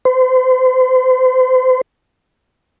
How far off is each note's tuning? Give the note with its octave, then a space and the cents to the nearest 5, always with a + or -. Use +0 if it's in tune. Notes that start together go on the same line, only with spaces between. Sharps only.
C5 -35